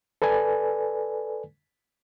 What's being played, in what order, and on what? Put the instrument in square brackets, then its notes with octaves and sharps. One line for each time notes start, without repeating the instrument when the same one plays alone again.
[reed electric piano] A4 B4 D5 G#5